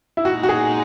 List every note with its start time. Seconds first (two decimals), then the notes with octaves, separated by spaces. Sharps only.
0.17 E4
0.25 A#2 G#3 D#4 F#4
0.43 F#4
0.49 G#4